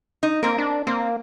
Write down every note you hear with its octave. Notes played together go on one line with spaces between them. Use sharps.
D#4
A#3 C4 A#4
D4
A#3 C4